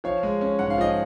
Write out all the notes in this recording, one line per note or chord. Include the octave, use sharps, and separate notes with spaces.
F3 C#5 F5
G#3
C#4
G#2 F#5
F5
F3 D#5